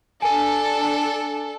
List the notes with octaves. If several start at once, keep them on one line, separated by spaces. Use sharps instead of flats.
D4 A4 G#5